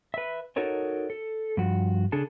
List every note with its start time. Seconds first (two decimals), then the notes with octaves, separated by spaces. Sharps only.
0.14 B4 E5
0.56 D#4 F#4 A4 A#4 C#5 D#5
1.10 A4
1.57 G2 F3 F#4
2.12 C#3 D4 G#4 A4 A5